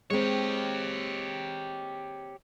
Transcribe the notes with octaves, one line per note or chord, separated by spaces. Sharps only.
G#3 C4 G4 C#5